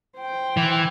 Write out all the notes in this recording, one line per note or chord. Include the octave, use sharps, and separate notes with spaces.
C5 G5
E3